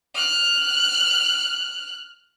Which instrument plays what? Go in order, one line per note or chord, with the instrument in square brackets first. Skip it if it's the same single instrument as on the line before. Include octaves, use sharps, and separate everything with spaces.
[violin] F6 F#6